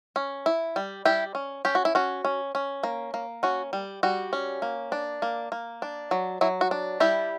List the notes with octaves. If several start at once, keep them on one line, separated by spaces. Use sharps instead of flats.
C#4
E4
G3
G3 E4 G4
C#4
C#4 G4
F#4
E4
C#4 F#4
C#4
C#4
A#3
A#3
C#4 F#4
G3
G3 F#4
C#4
A#3
D4
A#3
A#3
D4
F#3
F#3 E4
F#4
D4
G3 E4 G4